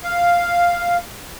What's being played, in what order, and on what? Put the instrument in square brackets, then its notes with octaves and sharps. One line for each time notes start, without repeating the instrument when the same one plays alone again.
[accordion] F5